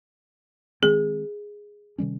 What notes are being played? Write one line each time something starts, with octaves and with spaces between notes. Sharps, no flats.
D#3 G#3 C4 G#4
C3 D#3 G3 C#4